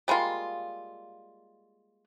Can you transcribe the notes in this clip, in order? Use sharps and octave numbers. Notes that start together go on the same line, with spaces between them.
G3 G#3 A#3 F4